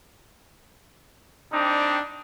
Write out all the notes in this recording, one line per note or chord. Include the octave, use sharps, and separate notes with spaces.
G3 C4 D4 D#4